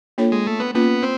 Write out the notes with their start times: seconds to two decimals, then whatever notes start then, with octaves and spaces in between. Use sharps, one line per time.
0.18 A#3 D4 F4 A4 C#5
0.32 G#3
0.47 A3
0.60 B3
0.74 A#3 B3 C#4 F4
1.03 C4